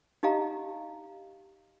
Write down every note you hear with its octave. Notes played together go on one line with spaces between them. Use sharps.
D#4 G4 D#5 F5 A#5